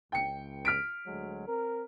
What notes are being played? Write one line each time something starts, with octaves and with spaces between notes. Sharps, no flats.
C#2 G5 C#7
F6 B6 D7
D2 F#3 G#3
C4 A#4